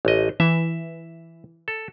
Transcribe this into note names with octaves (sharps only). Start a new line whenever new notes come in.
A1 D#5
E3 E5
A4